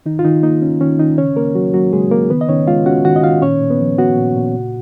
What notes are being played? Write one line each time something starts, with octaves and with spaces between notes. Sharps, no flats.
D#3 D#4
F4
D#3 D#4
A#3 D#4
C#4
D#3 C#4
D#3 D#4
C#3 C#4 C#5
C#3 A#3 A#4
F#3 F#4
F#3 A#3 F#4
C#3 G#3 G#4
C#3 A#3 A#4
D#3 B3 B4
D#5
D#3 C#4 C#5
G#3 F4 F5
C#4 F#4 F#5
D#3 F#4 F#5
D#5
D#3 F4 F5
A#2 C#4 C#5
A#2
B3 B4
F3
B3 F#4 F#5
A#2
A#2
C#3